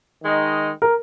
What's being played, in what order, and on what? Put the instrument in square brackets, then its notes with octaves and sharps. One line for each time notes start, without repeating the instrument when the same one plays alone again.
[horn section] D#3 G#3 D#4
[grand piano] A#4